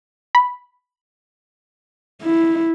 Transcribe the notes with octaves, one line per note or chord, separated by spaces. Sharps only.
B5
E4